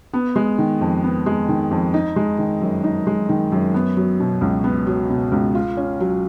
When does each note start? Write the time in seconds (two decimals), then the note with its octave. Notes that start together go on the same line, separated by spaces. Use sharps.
0.13 B3
0.36 G#3
0.58 D#3
0.81 F2
1.04 B3
1.26 G#3
1.49 D#3
1.71 F2
1.94 D#4
2.16 G#3
2.39 D#3
2.61 F#2
2.84 D#4
3.07 G#3
3.29 D#3
3.52 F#2
3.74 B3
3.97 F#3
4.20 B2
4.41 C#2
4.64 B3
4.87 F#3
5.10 B2
5.32 C#2
5.55 F4
5.77 C#4
6.00 F#3